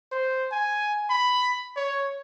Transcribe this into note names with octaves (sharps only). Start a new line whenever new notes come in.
C5
G#5
B5
C#5